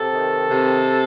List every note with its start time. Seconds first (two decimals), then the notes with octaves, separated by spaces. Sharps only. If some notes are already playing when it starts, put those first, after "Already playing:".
Already playing: C3 A4
0.14 D#3
0.49 C3